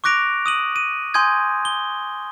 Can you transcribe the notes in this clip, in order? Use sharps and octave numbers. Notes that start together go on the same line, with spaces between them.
C#6 D6 F#6 A#6 D7 F7
D#6 D#7 F#7
D#7
G#5 C6 D#6 G6 G#6
G7